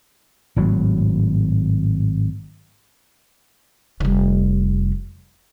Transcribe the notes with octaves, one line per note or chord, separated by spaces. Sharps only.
G#1 A2 F#3
F1 G3